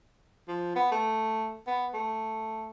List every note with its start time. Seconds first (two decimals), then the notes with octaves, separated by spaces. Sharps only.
0.48 F3
0.76 B3
0.91 A3
1.67 B3
1.94 A3